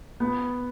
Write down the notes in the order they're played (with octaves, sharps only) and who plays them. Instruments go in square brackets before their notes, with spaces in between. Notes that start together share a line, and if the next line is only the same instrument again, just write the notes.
[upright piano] B3